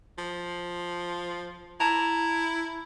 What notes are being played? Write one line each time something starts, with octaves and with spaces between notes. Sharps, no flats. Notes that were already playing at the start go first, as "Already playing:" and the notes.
F3
E4 A5 A#5